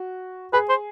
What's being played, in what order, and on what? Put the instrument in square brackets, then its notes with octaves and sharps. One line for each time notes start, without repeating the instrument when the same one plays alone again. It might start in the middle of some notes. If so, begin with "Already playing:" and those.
Already playing: [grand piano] F#4
[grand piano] G#4 [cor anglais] B4
[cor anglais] C5